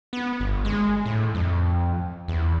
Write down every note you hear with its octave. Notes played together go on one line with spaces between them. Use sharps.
B3
G1
G#3
A2
F2
E2